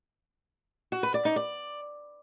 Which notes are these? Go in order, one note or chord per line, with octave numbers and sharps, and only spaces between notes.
F#4
B4
D5
D#4
D5